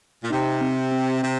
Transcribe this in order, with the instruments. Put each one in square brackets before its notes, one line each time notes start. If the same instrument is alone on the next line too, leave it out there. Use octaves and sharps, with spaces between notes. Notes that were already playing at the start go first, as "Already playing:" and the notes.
[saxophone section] A#2
[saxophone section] C3 [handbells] D#4
[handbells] C4
C4
[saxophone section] C3 [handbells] C4